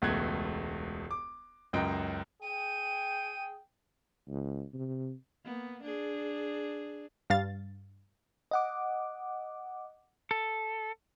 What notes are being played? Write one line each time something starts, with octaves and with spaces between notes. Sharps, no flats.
E1 C#2 B2 A3 F#6 G#6
D6
C#2 F#2 D#5 G5
G#4 G5 D#7
C#2
C3
A#3 B3
D4 G#4
G2 F5 A6
D#5 F#5 D6
A4